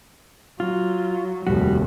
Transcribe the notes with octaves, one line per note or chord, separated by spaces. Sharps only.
F#3 F4
F1 D#2 G3 F#4